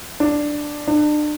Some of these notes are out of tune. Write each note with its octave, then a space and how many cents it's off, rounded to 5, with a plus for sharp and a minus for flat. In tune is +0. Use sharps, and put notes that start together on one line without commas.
D4 +5
D4 +35